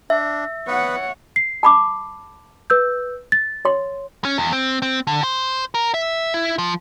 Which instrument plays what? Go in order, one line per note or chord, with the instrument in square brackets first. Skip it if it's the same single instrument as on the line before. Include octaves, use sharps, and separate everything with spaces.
[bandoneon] D4 [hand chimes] E5
[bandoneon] B3 B4 [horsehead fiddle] C#5 F#5
[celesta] C7
[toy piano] A5 B5 D6
[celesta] B4 E6 G6
A6
[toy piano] C#5 C6
[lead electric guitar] C#4
E2
C4
C4
D3
C5
A#4
E5
E4
F3